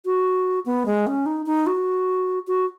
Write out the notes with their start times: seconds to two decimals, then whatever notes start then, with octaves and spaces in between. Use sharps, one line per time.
0.05 F#4
0.66 B3
0.86 G#3
1.07 C#4
1.26 D#4
1.46 D#4
1.67 F#4
2.47 F#4